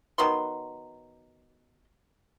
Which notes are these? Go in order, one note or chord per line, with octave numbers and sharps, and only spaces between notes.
D#3 F#3 B3 C6